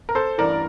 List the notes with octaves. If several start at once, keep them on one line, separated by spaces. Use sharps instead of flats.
A#4
A4 C5
A1 G2 E3 A#4 D5